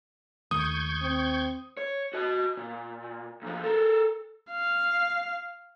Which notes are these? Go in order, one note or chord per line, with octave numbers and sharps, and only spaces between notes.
D#2 D#3 A3 C#6 D#6 G6 G#6
C4
C#5
F#4 D#5
A#2
B1 F3
A4 A#4
F5